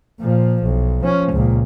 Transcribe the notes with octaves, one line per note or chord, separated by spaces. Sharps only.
A#2 F3
B1
F3 C#4
C#2 A#2